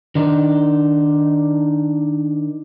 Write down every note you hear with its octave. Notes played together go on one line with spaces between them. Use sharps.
D#3 D4 D#4